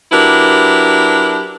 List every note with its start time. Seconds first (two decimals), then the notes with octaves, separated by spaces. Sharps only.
0.12 F#3 D4 E4 G4 A#4 B4